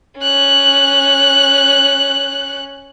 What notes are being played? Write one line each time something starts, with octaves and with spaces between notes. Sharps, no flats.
C#4 F#6